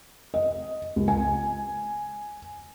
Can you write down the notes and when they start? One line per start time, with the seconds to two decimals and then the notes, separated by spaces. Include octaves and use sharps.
0.34 D#5
0.96 C#2
1.08 G#5